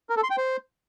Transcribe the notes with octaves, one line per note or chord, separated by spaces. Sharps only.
A#4
A4
C6
G5
C5